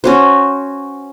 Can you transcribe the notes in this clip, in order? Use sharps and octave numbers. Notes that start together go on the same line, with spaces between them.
C#4 F#4 C5